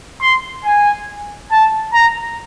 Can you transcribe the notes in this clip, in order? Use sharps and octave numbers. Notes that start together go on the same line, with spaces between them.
C6
G#5
A5
A#5